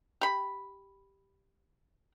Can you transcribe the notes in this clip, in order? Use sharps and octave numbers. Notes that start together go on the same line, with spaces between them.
G4 B5